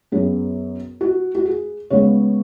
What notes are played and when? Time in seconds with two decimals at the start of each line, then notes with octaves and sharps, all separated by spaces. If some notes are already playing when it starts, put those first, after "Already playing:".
0.12 F#2 F#3 B3 G#4
1.01 F#4
1.35 F#4
1.46 G#4
1.90 C#3 G#3 B3 C#5